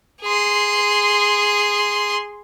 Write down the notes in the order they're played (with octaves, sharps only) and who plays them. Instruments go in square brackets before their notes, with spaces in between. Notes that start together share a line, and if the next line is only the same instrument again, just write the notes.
[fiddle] G#4 C6